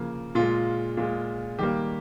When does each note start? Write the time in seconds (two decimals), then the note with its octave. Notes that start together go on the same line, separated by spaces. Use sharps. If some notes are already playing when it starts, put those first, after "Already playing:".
Already playing: C#3 F3 A#3
0.35 A#2 G#3 F4
0.97 A#2 G#3
1.59 D#3 G3 A#3 G4